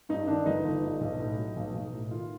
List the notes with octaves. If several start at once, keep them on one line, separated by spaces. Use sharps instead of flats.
G2 D#4
D#3 D4
G1 D#4
G1
G2
B1
A2
F#3
B1
B1
A2
D#3 F4